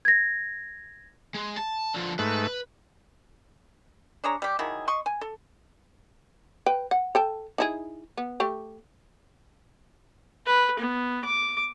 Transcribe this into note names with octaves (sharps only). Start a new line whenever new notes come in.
G#6 A#6
G#3
A5
D3 F3
G#2 A3 B4
D4 G#4 C#5 A#5
G3 G4
D#3 F#3 E4 G#4
D#5 C6 C#6
G#5
A4
B4 G5
F#5
A4 G5 A5
D#4 E4 G#4
B3
A3 G4
B4
B3
D6